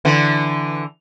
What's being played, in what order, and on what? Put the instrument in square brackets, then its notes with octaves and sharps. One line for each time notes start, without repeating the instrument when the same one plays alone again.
[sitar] D3 E3